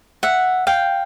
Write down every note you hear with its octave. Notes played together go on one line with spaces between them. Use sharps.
E5 F#5
F5 G5